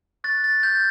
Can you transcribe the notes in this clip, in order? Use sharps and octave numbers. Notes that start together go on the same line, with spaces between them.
C#6 F#6 A6
A6
G6